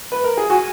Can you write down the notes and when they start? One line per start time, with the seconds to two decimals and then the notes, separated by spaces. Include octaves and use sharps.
0.12 B4
0.24 A#4
0.37 G#4
0.49 F#4 G#5